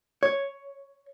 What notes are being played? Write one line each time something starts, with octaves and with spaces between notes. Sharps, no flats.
C#5